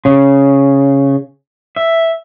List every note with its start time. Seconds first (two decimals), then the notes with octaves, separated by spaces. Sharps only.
0.05 C#3
1.76 E5